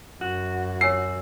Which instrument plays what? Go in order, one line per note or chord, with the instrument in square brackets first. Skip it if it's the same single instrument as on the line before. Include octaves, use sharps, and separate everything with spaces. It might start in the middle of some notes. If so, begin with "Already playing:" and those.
[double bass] F#2 [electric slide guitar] F#4
[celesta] C#5 G#5 E6 [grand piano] C7